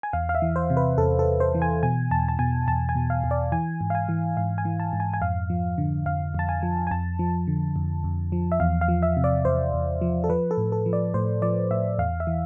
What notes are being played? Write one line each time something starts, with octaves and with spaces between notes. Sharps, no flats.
G#5
E2 F5
F5
E5
E3
C5
C3
B4
E2 A4
A4
E2
C5
E3
G#5
B2 G#5
E2 A5
A5
B2 G#5
E2 A5
G#5
B2
F5
E2
D5
E3 G#5
G#2
F5
G#5
E3
G#2 F5
G#5
E3
A5
G#2
G#5
G#5
F2 F5
F3
D3
F2 F5
F2 A5
G#5
F3
G#5
F2 A5
F3
D3
F2
F2
F3
E5
E2 F5
F5
F3
E5
C3
D5
E2 C5
E2
F3
A4
F3 B4
A4
A2
A4
F3
D5
A2 C5
F3 D5
A2 E5
E2 F5
E5
E3